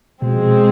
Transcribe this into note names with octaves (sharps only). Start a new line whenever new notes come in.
B2 F3 G#3 C4